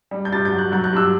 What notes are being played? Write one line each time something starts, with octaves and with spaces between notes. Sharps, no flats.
G3
G6
G2 A6
G6
F#3
F#6
F#3 G6
F#6
G2 E6